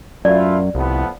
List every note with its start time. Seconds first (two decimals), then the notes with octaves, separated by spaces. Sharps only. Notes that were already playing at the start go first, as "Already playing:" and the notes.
0.25 F#2 A3 E4 F4 D5
0.75 C2 A2 F3 B3